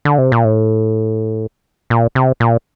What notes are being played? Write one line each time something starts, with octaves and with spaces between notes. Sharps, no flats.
D3
C3
A#2
A2
A#2
C3
A#2